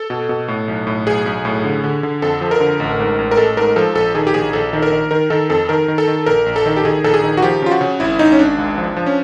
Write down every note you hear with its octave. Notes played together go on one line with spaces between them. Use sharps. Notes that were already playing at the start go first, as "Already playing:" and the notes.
Already playing: A4
B2
B2
A2
B1
A2
B1 G#4
B1
A2
D3
D3
D3
F2 A4
F3
A#4
D3
A1
G#2
A1
A#4
A1 A4
G#2 A#4
F3 A4
A#1 A4
D#3 G#4
G4
A#1 G#4
A#1 A4
D#3
A#4
D#3
D#3 A#4
D#3 A4
F2 A4
D#3 A#4
D#3
A4
D#3
A#1 A#4
A#1
A4
D#3
G4
D#3 G#4
A#1 A4
G#4
D#3
F#4
F3 G4
C#3 F4
F#4
C#3
G#1 E4
G#1 D#4
C#4
G#1 D4
C#2
F3
F3
C#4